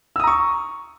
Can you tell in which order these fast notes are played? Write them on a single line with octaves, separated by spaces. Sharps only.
E6 D#6 A#5 C#6